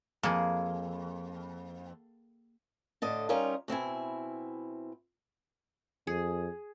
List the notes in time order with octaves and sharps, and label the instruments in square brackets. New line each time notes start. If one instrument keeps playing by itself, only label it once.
[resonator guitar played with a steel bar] F2 [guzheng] A#3 G#4
[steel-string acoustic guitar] A2 D3 D#5 A5
G3 C#4 D#4 F4 A#4
B2 C4 E4 G#5
[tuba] F2 [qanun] G#4